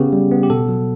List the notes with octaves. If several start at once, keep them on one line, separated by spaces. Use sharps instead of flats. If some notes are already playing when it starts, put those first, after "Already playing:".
Already playing: C#3 B3 G4
G3
B3
G4
B2 A4
F#3